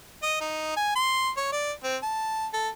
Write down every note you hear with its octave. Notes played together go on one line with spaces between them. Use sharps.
D#5
D#4
G#5
C6
C#5
D5
C4
A5
A4